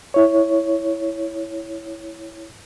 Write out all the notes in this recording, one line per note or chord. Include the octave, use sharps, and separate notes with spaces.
E4 C#5